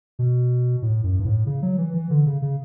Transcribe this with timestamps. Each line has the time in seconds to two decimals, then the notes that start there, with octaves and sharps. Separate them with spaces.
0.19 B2
0.82 A2
1.04 F#2
1.20 G2
1.25 A2
1.46 C#3
1.62 F#3
1.78 E3
1.94 E3
2.10 D3
2.26 C#3
2.42 C#3